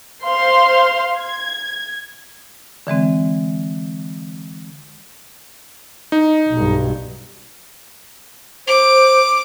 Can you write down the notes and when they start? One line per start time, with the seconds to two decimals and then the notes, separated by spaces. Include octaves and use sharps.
0.24 C5 F5 C6
1.18 G#6
2.87 D3 E3 G#3 C4
6.12 D#4
6.51 B1 G2
8.67 C5 D6